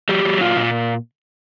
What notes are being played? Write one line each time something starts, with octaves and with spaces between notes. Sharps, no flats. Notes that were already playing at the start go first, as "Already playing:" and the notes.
F#3 G4
F#3
A#2 F4
A#2